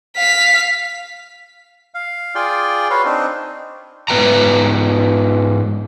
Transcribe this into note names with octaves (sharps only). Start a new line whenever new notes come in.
F5 B6
F5
F4 G#4 D5 G5
F#4 B4 C#5 F5
C4 D4 D#4
G#2 B3 B4 G5 A#5